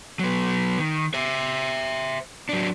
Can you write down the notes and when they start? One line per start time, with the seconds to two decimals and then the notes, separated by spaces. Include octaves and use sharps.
0.19 F#3 B3
0.79 D#3
1.14 C5 E5
2.49 F#3 D4